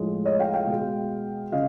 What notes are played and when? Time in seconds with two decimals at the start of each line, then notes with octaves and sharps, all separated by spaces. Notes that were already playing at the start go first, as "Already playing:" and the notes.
Already playing: A2 F3 G#3
0.25 C#5 D#5
0.39 F5 G5
0.54 F5 G5
0.67 B2 G#3
1.52 C#3 D#5 F5